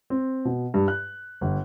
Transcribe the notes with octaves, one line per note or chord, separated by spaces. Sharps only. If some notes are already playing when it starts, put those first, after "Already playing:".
C4
B2
G2
F#6
G1